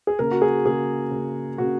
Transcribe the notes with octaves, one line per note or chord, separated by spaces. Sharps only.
G#4
C#3 A#3 A#4
F#4
G#4
C#3 A#3 G#4
C#3 A#3
C#3 A#3 F#4